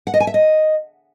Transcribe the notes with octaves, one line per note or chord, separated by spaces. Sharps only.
F#5
D#5
G#5
E5
D#5